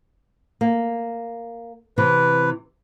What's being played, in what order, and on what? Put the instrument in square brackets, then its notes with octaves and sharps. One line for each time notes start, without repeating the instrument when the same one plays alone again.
[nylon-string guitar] A#3
[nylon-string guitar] C3 E3 C4 [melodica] B4